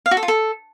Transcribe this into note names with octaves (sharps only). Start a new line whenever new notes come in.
F5
F#4
A4
F4
A4